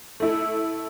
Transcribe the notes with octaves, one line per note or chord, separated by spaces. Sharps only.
A3 E4 A4